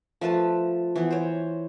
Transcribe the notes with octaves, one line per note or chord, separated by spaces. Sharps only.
F3 A3 B4 A5
E3 B3
C5 C#5